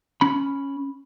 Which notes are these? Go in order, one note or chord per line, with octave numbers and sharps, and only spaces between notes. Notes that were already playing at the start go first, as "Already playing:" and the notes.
C#4 B5